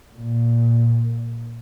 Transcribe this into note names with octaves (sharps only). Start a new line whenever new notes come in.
A#2